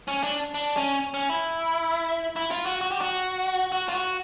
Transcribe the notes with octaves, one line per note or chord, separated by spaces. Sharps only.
C#4
D4
D4
C#4
C#4
E4
E4
F4
F#4
F#4
G4
F#4
F#4
F4
F#4